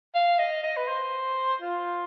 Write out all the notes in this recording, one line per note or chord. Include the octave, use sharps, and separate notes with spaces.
F5
D#5
D#5
B4
C5
F4